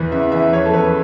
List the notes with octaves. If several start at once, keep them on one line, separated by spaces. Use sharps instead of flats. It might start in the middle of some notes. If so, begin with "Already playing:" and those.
Already playing: E2 E3 B4
C#3 E5
E3 E5
E2 C#5
A4
E2 B4